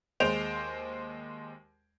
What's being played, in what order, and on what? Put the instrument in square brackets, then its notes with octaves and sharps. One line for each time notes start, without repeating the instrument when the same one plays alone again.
[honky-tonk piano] D#2 G#3 C5 G6 D7 F7